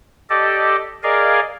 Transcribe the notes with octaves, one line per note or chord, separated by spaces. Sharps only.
G4 A4 D5 D#5
G#4 A#4 D5 D#5 F5 G#5